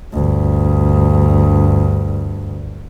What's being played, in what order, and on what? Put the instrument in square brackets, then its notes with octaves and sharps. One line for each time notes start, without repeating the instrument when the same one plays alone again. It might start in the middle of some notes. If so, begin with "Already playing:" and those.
[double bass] D2 G2